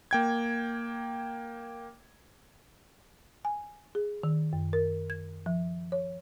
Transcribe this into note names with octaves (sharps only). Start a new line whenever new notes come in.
A#3 G5 G#6
G#5
G#4
D#3
F#2
A#4
G#6
F3
C#5